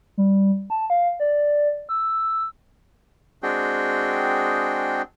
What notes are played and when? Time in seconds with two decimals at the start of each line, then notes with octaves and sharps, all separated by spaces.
0.18 G3
0.70 A5
0.90 F5
1.20 D5
1.89 E6
3.43 G#3 C4 D4 F#4 G#4 G5